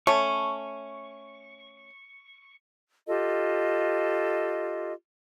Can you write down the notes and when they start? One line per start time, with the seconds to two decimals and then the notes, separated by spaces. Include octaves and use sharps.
0.07 A3 C#4 C#6
3.07 F4 G4 A4 D#5